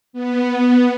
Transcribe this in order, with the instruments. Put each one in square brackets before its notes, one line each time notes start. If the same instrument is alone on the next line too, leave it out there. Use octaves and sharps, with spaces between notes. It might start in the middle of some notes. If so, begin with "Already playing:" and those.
[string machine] B3